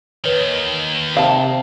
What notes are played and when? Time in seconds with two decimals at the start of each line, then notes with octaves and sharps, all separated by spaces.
0.24 D#2 D#3 B4 C#5
1.17 C3 F5 A5